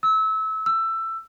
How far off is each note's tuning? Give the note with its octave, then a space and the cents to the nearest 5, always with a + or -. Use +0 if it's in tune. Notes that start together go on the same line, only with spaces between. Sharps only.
E6 -25
E6 +15